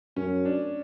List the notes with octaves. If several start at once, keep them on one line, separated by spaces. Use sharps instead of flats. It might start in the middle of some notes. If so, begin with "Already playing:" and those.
F#2 C#4
D4